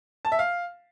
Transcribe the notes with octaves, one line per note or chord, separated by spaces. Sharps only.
A5
E5
F5